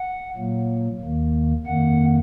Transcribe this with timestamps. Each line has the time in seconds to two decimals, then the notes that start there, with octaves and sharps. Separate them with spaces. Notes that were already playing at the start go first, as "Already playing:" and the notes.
Already playing: F#5
0.36 A#2 F#3 A#3
1.01 D#2 D#3 A#3
1.66 F2 D#3 A#3 F#5